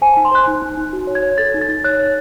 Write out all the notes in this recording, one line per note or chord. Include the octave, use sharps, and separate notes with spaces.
C5 G#5
D#4 A5
C6
C5 F#6
D#4
D#4
D#4
F#4
C#5
G#6
C#5
A4 A6
D#4
A6
D#4
C#5 F#6
C#5